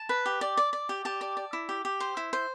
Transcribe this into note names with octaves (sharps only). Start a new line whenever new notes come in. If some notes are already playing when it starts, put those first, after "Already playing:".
Already playing: A5
B4
G4
D5
D5
D5
G4
G4 A5
D5
D5
E4
G4
G4
C5
E4
C5